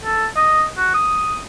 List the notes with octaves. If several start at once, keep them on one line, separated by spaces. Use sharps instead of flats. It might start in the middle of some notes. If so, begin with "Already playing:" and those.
A4
D#5
F#4
D#6